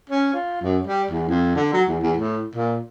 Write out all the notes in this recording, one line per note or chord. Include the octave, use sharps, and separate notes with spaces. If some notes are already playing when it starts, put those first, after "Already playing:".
C#4
F4
F#2
G3
E2
F2
D3
F#3
E2
E2
A2
A#2